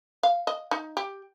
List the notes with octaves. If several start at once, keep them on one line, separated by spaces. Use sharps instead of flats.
F5
D#5
D#4
G4